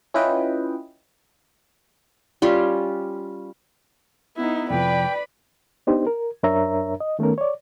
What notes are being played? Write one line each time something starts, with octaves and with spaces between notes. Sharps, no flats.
C#4 E4 F4 B4 D#5 G5
G3 C#4 F4 G4
B3 D#4 E4
F2 C3 F3 B4 D5 G5 B5
B3 D4 D#4 G4 C5
A#4
F#2 D4 A#4 C#5 E5 A#5
D#5
D#3 A3 B3 C#4 A#4
C#5 D5